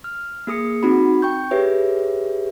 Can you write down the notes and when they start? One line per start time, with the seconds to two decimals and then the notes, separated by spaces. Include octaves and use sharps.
0.04 F6
0.47 A#3 G#4 D#6 C#7
0.83 C4 D#4 F#4 B5
1.22 G5 C#6 G6
1.51 G4 G#4 B4 C#5 E5